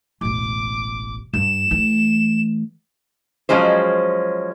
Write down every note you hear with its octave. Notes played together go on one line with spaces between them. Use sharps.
E1 A1 D6
G2 E7
E3 A3
F3 F#3 G#3 C#4 C5